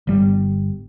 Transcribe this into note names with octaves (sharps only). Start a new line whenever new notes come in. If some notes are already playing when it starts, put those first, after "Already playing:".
G1 G3